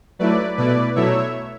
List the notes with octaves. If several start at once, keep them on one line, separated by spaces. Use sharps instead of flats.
F#3 A3 E4 B4 D5
B2 A3 E4 B4 D5
B2 F#3 A3 E4 C#5 E5